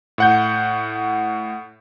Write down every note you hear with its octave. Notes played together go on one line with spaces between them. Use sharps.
A2 F#5 G6